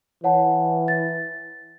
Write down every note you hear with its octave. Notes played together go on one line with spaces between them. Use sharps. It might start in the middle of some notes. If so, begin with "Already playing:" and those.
E3 C#5 F#5 A5
A6